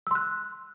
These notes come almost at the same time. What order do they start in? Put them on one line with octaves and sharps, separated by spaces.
E6 C6 F#6